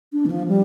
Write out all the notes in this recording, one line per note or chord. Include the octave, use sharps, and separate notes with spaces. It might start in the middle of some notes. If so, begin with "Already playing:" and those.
D4
E3
F3
G3